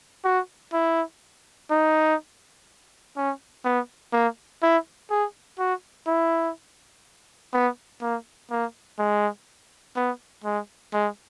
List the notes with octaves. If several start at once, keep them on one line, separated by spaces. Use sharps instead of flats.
F#4
E4
D#4
C#4
B3
A#3
E4
G#4
F#4
E4
B3
A#3
A#3
G#3
B3
G#3
G#3